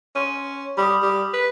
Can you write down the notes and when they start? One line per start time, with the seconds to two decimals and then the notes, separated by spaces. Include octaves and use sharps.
0.15 C#4 C6 D#7
0.77 G3 B5 D6 D#6
1.02 G3
1.33 B4